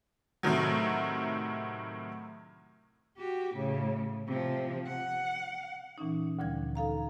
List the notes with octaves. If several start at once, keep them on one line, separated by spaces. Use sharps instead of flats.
A2 C3 D#3 F#3
F#4 G4
A2 C#3
C3 F3
F#5
A#2 E3 C#4 D#4
D2 A#2 D3 F3 G3 G#6
D#4 A4 F5 A#5